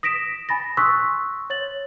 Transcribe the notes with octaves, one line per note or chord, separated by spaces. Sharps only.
D#6 A#6 B6 D7 E7
G#5 B5 A6 A#6
C6 C#6 D#6 E6 F#6 B6
C#5 A6 F#7